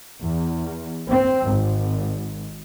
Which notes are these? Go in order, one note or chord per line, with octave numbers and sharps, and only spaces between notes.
E2
C4
G#1